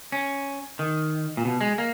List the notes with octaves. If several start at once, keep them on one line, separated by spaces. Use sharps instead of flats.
C#4
D#3
A#2
B2
G#3
A#3